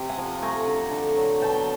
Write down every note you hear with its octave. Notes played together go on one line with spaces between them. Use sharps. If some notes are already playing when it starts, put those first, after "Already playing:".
Already playing: C3
F#5 G#5
F3
A3 G#5 A#5
D3
D3
F#3
B2 G5 A5